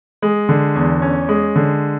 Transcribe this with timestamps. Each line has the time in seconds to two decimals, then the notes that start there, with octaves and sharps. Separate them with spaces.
0.22 G#3
0.49 D3
0.76 E2
1.02 C#4
1.29 G#3
1.56 D3